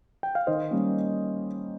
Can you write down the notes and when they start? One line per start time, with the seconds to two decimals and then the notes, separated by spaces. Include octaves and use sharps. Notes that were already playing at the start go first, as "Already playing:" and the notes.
0.23 G5
0.35 F5
0.47 D#3 C5 D#5
0.71 G3 A#3 C#4